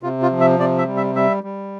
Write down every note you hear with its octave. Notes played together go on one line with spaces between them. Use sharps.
C3 F4
F4
F3
E5
C3 D5
E5
G3
E5
G3 E5
G3